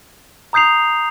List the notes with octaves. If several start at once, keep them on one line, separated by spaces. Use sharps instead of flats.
A#5 D#6 G6 C7 F7